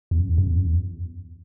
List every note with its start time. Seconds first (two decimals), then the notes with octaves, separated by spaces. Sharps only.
0.11 E2
0.20 F#2
0.29 E2
0.38 F#2
0.48 E2
0.57 F#2
0.66 E2